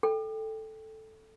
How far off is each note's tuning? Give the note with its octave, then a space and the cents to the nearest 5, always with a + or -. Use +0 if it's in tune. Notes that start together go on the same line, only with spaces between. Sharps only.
A4 +0 G5 +10